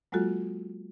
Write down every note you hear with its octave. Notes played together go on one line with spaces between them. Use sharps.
F#3 G#3 A#3 F4 F#4 A4